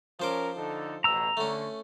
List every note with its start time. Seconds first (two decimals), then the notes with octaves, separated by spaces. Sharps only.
0.20 F3 C#4 A#4 C5 D6
0.56 D3 D#4 A4
1.04 A1 B2 A#5 E6
1.37 D3 A3 C#4